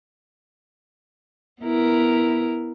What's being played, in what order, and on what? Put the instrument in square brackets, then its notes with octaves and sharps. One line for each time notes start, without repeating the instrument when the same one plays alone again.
[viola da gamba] B3 E4 A#4